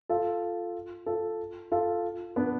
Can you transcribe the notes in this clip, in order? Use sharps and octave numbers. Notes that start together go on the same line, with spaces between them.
F4 A4
F4 A4
F4 A4
B3 D4